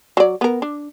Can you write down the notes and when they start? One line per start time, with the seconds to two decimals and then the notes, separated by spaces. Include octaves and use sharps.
0.17 F#3 D5
0.41 B3 A#4
0.62 D4